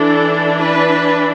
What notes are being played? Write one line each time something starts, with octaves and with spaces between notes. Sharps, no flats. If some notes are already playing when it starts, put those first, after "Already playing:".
Already playing: E3 D4 A4
B4